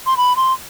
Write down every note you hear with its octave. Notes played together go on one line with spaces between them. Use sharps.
C6
B5
C6